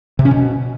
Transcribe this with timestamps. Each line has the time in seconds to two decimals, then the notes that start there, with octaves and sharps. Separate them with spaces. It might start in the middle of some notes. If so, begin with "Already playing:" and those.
0.19 C3
0.25 C#4
0.31 B2